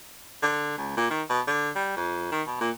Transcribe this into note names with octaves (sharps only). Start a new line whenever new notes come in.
D3
C#2
A#2
D#3
B2
D3
G3
F2
D#3
B2
A#2